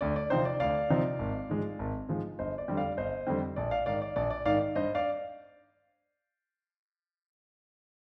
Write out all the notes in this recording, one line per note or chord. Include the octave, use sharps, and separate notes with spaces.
D2 D5
D5
C3 F3 C4 D#4 C5
D5
D2 D5 F5
C3 F3 C4 D#4
G#1
G#2 F3 G#3
G#1
G#2 F3 G#3
G1 C5 D#5
D5
F2 D3 G3 C4
D5 F5
G1 C5 D#5
F2 D3 G3 C4
A#1 D5
D5 F5
G#2 D#3 D5 F5
D5
A#1 D5
D5
G#2 D#3 D5 F5
G2 C5 D#5
D5 F5